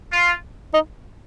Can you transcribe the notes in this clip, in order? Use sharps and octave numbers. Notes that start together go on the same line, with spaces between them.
F4
D#4